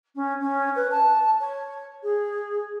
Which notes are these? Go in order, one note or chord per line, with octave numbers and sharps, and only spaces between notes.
C#4
C#4
B4
A5
C#5
G#4